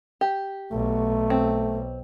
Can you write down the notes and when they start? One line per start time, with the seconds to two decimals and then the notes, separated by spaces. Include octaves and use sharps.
0.21 G4
0.72 B1 A3
1.30 C4